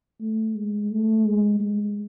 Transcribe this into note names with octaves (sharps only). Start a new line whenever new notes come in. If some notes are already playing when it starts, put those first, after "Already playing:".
A3
G#3
A3
G#3
G#3